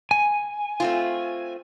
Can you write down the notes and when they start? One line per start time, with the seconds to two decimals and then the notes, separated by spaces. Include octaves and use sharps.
0.11 G#5
0.80 A3 C4 F4